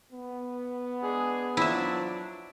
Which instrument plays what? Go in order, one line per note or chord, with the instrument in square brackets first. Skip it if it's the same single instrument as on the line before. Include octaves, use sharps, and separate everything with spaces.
[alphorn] B3
[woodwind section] G#3 D4 G#4
[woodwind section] F3 F#3 D4 [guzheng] E4 E5